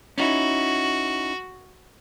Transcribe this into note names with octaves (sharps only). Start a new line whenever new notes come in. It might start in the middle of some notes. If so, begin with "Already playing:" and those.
C#4 D#4 E4 F#4